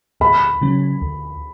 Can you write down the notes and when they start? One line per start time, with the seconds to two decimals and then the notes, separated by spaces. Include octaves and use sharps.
0.20 D2 B5
0.62 C#3 F#3 C#4
1.02 D2